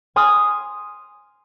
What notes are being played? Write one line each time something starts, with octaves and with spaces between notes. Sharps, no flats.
G#5 C6 D#6 F6